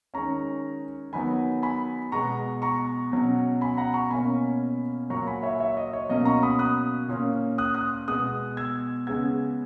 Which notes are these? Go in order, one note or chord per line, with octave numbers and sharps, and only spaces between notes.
D#3 G#3 C#4 A#5 C#6
D#3 F#3 B3 G#5 B5
G#5 B5
B2 G#3 B3 A#5 C#6
A#5 C#6
B2 F#3 C#4
G#5 B5
F#5 A#5
A#5 C#6
B2 A#3 C#4 G#5 B5
A#2 F#3 A#3 A#5 C#6
G#5 B5
C#5 E5
C#5 E5
D#5
C#5
B2 F#3 A#3 C#4 D#5
A#5 C#6
B5 D#6
D#6 F#6
A#2 A#3 C#4
D#6 F#6
D#6 F#6
B2 G#3 B3 D#6 F#6
E6 G#6
C#3 G#3 B3 E6 G#6